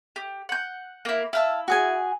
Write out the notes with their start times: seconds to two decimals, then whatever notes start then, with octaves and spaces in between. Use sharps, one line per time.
0.16 G4
0.49 F#5 G6
1.05 A#3 E4
1.33 E4 F5 A5 E6
1.68 F#4 G#4 G#5